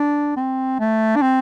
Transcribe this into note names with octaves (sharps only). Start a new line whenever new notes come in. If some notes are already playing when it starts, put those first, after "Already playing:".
Already playing: D4
C4
A3
D4
C4